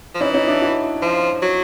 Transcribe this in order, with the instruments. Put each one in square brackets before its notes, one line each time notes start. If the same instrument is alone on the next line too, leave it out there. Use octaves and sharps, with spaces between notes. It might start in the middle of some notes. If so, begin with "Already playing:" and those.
[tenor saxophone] F3
[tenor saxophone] E3 [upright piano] C#4 D#4
[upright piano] C#4 D#4
D4 E4
E4 F#4
[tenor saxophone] F3
F#3